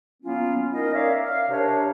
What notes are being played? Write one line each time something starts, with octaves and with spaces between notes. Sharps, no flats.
F#3 A#3 B3 C#4 E4 F4
C#4 D#4 A#4 D#5
D#4 A#4 C#5 D5 E5 F5
F5
C3 D4 A#4 C5 C#5